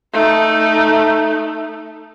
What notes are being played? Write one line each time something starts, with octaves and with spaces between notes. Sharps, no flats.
A3 D#4